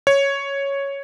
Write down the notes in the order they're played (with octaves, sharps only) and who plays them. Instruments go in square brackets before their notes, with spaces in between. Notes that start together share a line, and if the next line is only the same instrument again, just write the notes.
[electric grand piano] C#5